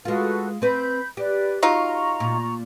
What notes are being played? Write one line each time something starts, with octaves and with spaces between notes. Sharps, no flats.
G#3 F4 F#4 A4 B4
C4 B4 B5 G6
G4 B4 D5
F#3 D#4 F4 A#5 C#6
A#2